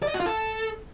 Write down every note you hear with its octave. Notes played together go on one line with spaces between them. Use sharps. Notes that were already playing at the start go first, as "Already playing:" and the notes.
D5
D#5
F#4
F4
A4